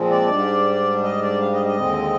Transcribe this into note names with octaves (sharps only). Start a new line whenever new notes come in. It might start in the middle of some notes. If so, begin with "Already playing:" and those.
Already playing: A#2 F3 G#3 C4
D5
G#2 G3 D4
D#5
D5
F5
D#5
D#5
D#2 D3 G#3 C4